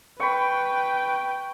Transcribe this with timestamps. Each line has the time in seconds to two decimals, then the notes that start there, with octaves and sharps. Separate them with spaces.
0.20 B4 G5 B5 C#6